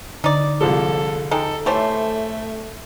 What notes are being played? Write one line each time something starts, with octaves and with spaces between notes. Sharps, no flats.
D3 D#4 D5
C2 F3 G#3 A4
G#3 D#4 A4 G5
E3 A3 G4 A4 C5 C#5 A5